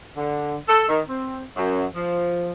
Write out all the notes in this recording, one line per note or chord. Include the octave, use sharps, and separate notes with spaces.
D3
A4
D#3
C4
F#2
F3